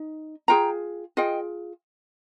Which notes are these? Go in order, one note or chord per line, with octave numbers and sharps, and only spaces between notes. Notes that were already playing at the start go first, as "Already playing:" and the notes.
Already playing: D#4
F4 G#4 G5 A#5
F4 G#4 D#5 G5